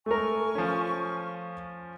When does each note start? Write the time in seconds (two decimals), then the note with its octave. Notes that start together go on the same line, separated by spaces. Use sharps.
0.06 A3 A#4 G#5 C#6
0.55 F3 C#4